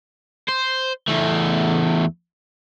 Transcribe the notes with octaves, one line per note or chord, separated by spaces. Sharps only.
C5
E2 A3